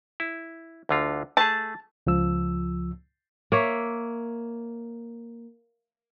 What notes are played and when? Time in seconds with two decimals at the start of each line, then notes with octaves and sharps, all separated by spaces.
0.20 E4
0.89 D2 D3 F4
1.37 A3 G#4 A5
2.07 C#2 F3 E6
3.52 A#3 C#5 E5